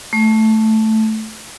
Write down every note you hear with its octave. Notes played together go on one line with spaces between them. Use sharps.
A3